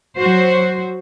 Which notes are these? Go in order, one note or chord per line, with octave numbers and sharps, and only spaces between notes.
F#3 F#4 C5